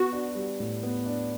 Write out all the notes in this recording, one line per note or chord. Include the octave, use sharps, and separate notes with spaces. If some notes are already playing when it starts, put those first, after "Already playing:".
Already playing: B3 F#4
D4
G3
A2
B3
D4